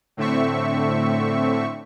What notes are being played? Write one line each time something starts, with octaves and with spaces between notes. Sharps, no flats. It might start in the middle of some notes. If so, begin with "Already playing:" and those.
A2 D3 A3 C4 E5 C#6